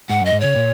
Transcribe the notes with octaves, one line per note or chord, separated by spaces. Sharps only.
G#2 F#5
F#2
D#5
G#2
C#3 C#5
A#2